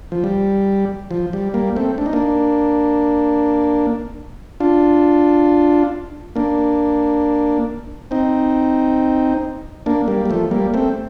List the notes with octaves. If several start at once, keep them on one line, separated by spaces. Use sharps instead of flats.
F3
G3
F3
G3
G3 A#3
A3 C4
D4
D#4
A#3 D4
D4 F4
A#3 D4
C4 D#4
A#3 D4
G3 A#3
G3
F3 A3
G3 A#3
A3 C4